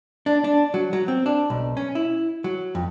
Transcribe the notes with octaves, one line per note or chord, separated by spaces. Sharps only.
D4
D4
F#3
F#3
C4
D4
B1
C#4
E4
F#3
F2